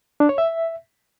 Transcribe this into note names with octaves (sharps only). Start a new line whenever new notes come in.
D4
C#5
E5